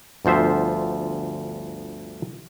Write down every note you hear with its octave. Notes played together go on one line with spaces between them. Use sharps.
G1 D2 F3 C5 E5